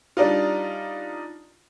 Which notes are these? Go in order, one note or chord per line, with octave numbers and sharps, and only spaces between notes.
G3 D4 D#4 F4